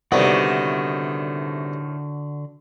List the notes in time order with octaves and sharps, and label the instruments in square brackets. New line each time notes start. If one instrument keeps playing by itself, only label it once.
[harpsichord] C2 B3 [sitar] A2 D#3 A3 [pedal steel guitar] D3 F#4 D5